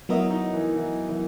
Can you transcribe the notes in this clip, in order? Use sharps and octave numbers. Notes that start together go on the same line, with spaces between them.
F#3 B3 E4 F#4 A#4 D#5
D#4
E3
E3
E3